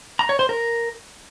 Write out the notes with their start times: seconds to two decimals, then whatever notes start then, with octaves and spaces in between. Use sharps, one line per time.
0.19 A#5
0.29 C#5
0.39 C5
0.49 A#4